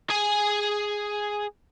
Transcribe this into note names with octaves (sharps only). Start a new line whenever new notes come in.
G#4 G#5